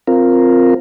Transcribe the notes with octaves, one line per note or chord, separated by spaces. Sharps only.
C4 F4 A#4